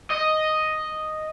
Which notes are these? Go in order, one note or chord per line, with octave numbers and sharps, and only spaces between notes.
D#5